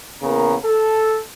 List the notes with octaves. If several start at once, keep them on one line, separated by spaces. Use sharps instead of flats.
E2 C#3 A#3 B3 A#4 A#5
A4